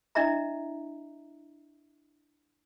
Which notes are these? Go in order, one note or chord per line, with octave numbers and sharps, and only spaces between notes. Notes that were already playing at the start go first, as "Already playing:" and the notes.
D4 E4 D#5 E5 A#5